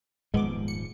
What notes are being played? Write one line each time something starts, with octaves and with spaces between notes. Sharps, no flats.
D#1 G#2 F3 G#3 B3 D6
C#7